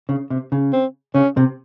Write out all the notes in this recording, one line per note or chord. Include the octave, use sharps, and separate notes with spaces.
C#3
C3
C#3
C4
C#3 C#4
C3